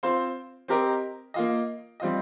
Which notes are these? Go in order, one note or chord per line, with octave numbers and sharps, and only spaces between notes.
C4 F4 C5
C4 G4 A#4 D#5
A#3 F4 D#5
G3 C4 F4 D#5